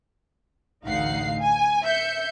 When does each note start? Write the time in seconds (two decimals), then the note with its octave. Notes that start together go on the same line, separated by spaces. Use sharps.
0.84 A1 D2 D#4 F5 F#5 C7
1.39 G#5
1.83 E5 G6 C#7